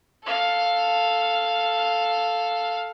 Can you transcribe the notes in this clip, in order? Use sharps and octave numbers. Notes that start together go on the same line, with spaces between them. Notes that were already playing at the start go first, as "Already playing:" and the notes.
A4 F5